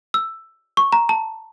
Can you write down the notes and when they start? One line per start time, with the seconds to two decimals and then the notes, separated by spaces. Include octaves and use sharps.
0.14 E6
0.77 C#6
0.93 A#5
1.09 A5